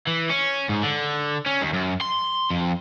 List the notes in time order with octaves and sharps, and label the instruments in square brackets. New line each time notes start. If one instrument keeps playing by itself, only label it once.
[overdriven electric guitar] E3
C#4
G#2
D3
C#4
D#2
F#2
C6
F2